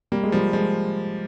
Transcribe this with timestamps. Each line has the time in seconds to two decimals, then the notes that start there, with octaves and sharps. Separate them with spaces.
0.12 G3 A#3
0.23 G#3
0.32 F3 G3
0.53 F3 G#3